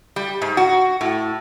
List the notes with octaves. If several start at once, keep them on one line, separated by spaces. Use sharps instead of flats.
G3
G#2
F#4
A2